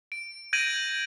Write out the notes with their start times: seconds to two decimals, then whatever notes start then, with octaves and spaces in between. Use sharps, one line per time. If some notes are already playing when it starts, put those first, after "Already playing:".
0.12 D7
0.53 G6 G#6 A#6 D7 D#7 F#7